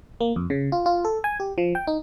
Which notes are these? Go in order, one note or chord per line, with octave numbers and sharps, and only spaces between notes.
A#3
F2
C#3
F4
F4
A4
G#5
G4
F3
G5
D#4